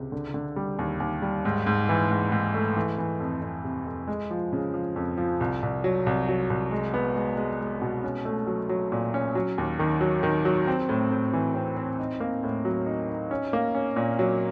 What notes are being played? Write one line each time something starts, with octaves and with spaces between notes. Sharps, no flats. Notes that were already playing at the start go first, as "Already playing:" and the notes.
Already playing: C#2 C3
D3
D3
G3
D#2
D#2
G3
G#2
G#2
E3
G#2
G#2
A3
E3
E3
F2
F2
C3
F2
G#3
F3
C#3
F3
F2
F3
C2
C2
F#3
C2
F#3
C2
G#3
B3
G#3
G#3
G#3
B2
C#4
A3
F#3
F#3
A#2
C#4
F#3
D#2
D#3
F#3
D#3
F#3
C4
A2
A2
E3
C4
C4
D#4
A#3
A2
F#3
D#4
D#4
C#4
A#3
C#4
A#2
F#3